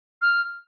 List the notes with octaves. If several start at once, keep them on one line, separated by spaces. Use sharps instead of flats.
F6